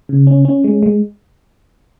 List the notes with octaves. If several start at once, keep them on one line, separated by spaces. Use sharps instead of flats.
C#3
C#4
C#4
G#3
G#3